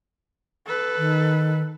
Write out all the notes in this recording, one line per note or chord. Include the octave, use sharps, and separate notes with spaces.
A4 B4
D#3